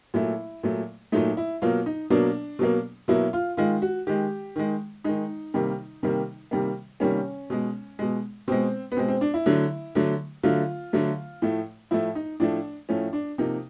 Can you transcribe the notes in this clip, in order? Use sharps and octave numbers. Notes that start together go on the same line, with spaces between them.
A#2 F#3 A3 E4
A#2 F#3 A3
A#2 F#3 A3 D#4
E4
B2 F#3 A#3 F4
D#4
B2 F#3 A#3 D4
B2 F#3 A#3
B2 F#3 A#3 E4
F4
D#3 G#3 F4
F#4
D#3 G#3 G4
D#3 G#3
D#3 G#3 D#4
C3 D#3 G3 A#3
C3 D#3 G3 A#3
C3 D#3 G3 A#3
C3 D#3 G3 A#3 C#4
B2 G#3
B2 G#3
B2 G#3 C4
B3
B2 G#3 C4
C4
D4
E4
D3 F#3 A3
D3 F#3 A3
D3 F#3 A3 F4
D3 F#3 A3
A2 F3 A3
A2 F3 A3 E4
D#4
A2 F3 A3 D4
A2 F3 A3 C#4
D4
C3 F3 A#3 D#4